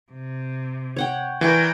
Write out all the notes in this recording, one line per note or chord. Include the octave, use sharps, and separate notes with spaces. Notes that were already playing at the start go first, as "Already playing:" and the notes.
C3
C#5 F#5 G5
E3 A#4 D5 G5 C#6 D6